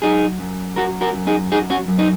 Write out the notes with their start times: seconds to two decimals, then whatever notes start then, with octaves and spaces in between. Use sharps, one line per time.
0.02 F#3 D#4 G#4
0.39 F#2
0.76 F#3 F#4 A#4
1.01 F#4 A#4
1.14 F#2
1.27 D#4 G#4
1.52 F#3 D#4 G#4
1.70 C#4 F#4
1.88 F#2
1.99 D#4